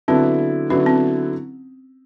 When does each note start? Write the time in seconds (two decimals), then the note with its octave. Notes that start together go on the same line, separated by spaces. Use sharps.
0.08 D3 F#3 B3 C4 E4
0.70 D3 F#3 B3 C#4 E4
0.86 C4